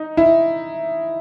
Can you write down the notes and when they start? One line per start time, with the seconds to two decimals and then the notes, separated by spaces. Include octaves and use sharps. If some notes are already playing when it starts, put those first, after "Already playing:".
Already playing: D#4
0.17 E4